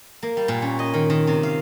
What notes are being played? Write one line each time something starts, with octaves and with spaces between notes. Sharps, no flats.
A#3
G3
A#2
C#4
D#5
D#3
D#3
C3
F5